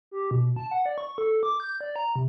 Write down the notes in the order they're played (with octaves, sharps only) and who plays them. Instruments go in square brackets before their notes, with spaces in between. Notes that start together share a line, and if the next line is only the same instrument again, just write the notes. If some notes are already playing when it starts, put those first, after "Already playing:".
[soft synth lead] G4
B2
A5
F#5
D5
C#6
A4
D6
G6
D5
A#5
C3